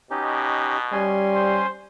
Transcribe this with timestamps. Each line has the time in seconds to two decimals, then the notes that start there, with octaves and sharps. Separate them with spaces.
0.11 B2 C#4 D#4 G4
0.93 G3 C#4 G#5 C6
1.35 C5